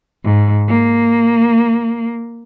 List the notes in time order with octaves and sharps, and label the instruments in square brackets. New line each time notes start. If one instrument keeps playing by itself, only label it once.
[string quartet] G#2
A#3